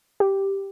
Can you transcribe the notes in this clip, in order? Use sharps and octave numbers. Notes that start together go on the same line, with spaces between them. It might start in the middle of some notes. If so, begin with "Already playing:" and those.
G4